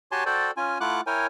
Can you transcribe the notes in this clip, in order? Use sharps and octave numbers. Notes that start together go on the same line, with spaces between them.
F#4 G4 C#5 G#5 A5 C6
F#4 A4 C5 D5 G5
C#4 F4 G#5
A3 E4 F4 F#5 D6 F#6
E4 A#4 C#5 G5 G#5